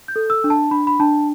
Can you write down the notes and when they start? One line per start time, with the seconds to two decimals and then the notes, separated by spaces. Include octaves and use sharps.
0.08 G6
0.16 A4
0.30 E6
0.44 D4
0.50 A5
0.71 D4 B5
0.87 B5
1.00 D4 A5